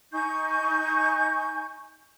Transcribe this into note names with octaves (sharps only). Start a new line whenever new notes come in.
D#4 G#5 C#6 G6